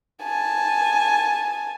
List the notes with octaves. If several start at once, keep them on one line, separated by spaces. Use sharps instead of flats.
G#5 A5